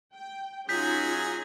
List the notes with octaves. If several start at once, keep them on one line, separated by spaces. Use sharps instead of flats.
G5
F#3 C#4 D#4 F4 G#4 G#5 G6 B6